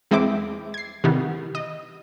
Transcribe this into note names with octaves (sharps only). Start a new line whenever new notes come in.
E2 G#3 C4 E4 C5 D6
G#6 C7
C3 D#3 E3 G3 B3
D#5